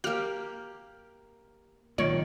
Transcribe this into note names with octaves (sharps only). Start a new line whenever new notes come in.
A#3 G4 F6
B1 A#2 D#3 C#5 D5